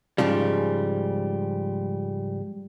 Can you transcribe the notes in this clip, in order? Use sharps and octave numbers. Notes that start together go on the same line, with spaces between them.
G#2 C#3 F3 G3